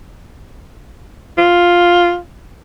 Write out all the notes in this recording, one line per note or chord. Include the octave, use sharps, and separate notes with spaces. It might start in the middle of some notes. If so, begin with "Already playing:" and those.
F4